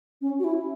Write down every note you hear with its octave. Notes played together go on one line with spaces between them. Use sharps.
C#4
F#4
E4